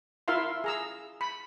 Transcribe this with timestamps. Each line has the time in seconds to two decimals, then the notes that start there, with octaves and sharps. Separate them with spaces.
0.28 E4 F4 A#4 E5 F5 C6
0.64 G#4 A#5 E6
1.21 B5